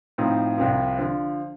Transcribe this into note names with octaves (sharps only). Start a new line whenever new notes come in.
A2 F3 C4 D#4
C2 C3 F3
D3 F3